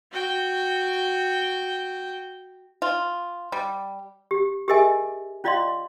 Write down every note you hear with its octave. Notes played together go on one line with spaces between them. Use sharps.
F#4 G5
F4
G3
G4
G4 G#4 A#4 D#5 E5 G#5
C#4 F4 D5 D#5 F5 C6